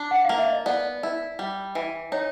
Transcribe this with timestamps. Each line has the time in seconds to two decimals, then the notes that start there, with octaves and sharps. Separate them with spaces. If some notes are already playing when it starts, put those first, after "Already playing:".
Already playing: D4
0.11 F#5
0.25 A#3 F5
0.38 E5
0.52 D#5
0.66 B3 D5
1.03 E4
1.39 G3
1.75 E3
2.12 D#4 C#5